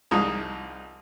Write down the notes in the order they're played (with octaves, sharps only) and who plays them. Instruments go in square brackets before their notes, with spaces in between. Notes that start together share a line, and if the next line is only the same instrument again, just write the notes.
[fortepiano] C2 F3 G#3 D#4